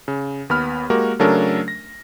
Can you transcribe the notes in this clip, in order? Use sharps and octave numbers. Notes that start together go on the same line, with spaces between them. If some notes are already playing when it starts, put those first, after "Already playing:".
C#3
D#2 B3 B5 F6
G#3 A#3 F#4 G4 A#4
C#3 F#3 A3 D4 A4 A#4
A#6